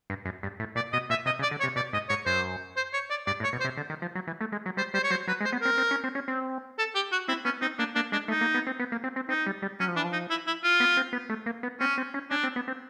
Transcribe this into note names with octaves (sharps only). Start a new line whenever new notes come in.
G2
F#2
G2
A2
A#2 D5
B2 D#5
A#2 E5
C3 D#5
C#3
D5
D3
C#5
C3
B2 D5
G#2 D#5
G#2 C#5
F#2 C5
C5
C#5
D5
G2 D5
A2
C#5
B2
C5
C3
D3
D#3
F3
F#3
E3
A3
G#3
F#3
G3 C5
G3 C5
C#5
F#3 C5
F#3 B4
G#3
C5
B3
C4 A#4
C4
C#4
C4
C#4
C4
A4
G4
F#4
C4 E4
B3 C#4
C4 D#4
A#3 D4
A#3 D4
G#3 D4
A3 D#4
A#3
B3
C4
B3
A#3
C4
C4
C4 D#4
G3
G3
F#3 C#4
F3
E3 D4
F3
D#4
E4
E4
F4
B3
C4
B3
A3
A#3
B3
C4 C#4
C4
C#4
C#4 D4
C4
B3
C4